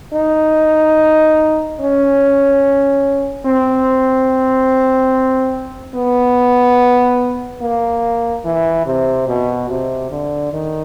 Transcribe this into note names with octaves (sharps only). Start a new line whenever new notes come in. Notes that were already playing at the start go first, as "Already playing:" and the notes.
D#4
C#4
C4
B3
A#3
E3
C3
B2
C3
D3
D#3